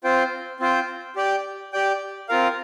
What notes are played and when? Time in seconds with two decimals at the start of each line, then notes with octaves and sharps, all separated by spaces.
0.04 C4 F4 C5 G5
0.60 C4 F4 C5 G5
1.16 G4 D5 G5
1.73 G4 D5 G5
2.29 C4 F4 A#4 F5